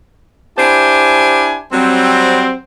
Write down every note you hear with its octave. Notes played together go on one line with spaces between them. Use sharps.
D4 E4 G4 C5 G#5
F#3 G3 C4